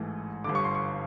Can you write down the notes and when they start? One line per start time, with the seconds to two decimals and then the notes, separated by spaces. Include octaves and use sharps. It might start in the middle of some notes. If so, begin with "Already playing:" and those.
Already playing: A1 G#2 E3 A3
0.44 G1 G2 D3 D6
0.55 C#6
0.64 C6
0.75 C#6